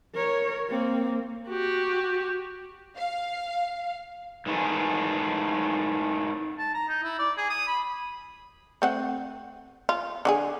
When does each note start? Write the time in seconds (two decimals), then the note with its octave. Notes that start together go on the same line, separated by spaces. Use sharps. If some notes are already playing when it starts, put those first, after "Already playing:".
0.15 A#4 C#5
0.69 A#3 C4
1.48 F#4 G4
2.97 F5
4.46 G#2 D#3 E3 A3 G#4
6.58 A5
6.74 A#5
6.88 D#4
7.03 E4
7.19 D5
7.37 G#4
7.50 D#6
7.67 B5
8.82 A3 C4 F#5
9.89 F4
10.25 D3 F#4 G#4